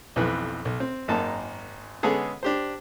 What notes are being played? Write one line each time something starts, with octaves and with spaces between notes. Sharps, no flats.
B1 F2 E3 B4
B1
C4
G#1 F#2 A#3 D#4 A5
D3 G#3 B3 C#4 G#4 A4
D4 G4 C5